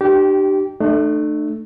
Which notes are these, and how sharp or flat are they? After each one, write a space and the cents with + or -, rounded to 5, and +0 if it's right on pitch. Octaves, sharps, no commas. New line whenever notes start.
D4 +35 G4 -25 G5 +0
A3 +0 D4 +45